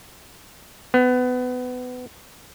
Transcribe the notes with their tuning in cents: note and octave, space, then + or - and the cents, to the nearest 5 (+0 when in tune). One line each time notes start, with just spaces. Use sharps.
B3 +25